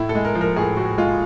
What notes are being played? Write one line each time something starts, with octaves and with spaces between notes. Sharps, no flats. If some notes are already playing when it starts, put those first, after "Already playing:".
Already playing: A2 E4
A4
G#3
A#4
F3
A#4
A2 G#4
A2 F#4
G#3 F4